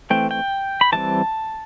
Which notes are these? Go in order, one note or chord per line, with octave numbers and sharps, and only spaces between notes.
E3 A3 C4 G5
G5
B5
E3 G3 C4 A5